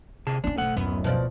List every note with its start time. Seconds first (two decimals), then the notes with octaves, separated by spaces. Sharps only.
0.27 C3 G#4 A5
0.44 A#3 C#4 D4
0.58 F#1 B1 A3 F#5
0.77 D1 F#2 B3
1.04 B2 F3 D5